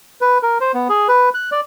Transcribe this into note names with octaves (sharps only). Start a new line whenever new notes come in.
B4
A#4
C5
B3
G#4
B4
F#6
D5